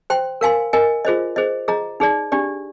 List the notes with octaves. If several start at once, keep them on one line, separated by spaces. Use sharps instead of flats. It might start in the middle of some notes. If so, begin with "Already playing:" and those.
C5 G5 C6
A#4 F5 G#5 C6
A#4 D#5 G#5
F4 G#4 C5 D#5
G#4 C5 D#5
G#4 D#5 A#5
D#4 G#4 D5
D4 G4 D5